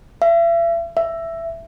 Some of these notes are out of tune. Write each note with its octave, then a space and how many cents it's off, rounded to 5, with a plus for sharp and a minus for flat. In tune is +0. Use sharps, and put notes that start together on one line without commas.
E5 +40
E5 +10